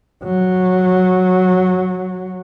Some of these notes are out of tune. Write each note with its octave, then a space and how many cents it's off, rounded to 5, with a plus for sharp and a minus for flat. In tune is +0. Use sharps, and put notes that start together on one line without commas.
F#3 -10